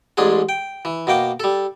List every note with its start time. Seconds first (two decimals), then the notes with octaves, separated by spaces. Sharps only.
0.17 A1 G#2 D4 G#4
0.49 G5
0.85 E3
1.07 B2 A#3 G5 D6
1.40 G3 A4